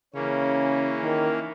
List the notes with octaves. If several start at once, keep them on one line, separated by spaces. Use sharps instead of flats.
C#3 E3 A#3 C#4
D#3